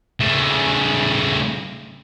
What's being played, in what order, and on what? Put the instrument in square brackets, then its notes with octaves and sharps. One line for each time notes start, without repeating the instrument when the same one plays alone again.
[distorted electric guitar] C#3 A3